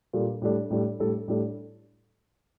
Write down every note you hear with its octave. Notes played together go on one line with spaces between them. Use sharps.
A#2 G3 D4 A4
A2 G3 D4 A4
A2 G3 D4 A4
A2 G3 D4 A4
A2 G3 D4 A4